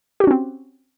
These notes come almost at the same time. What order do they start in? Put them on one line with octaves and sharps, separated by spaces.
G4 F#4 C#4 C4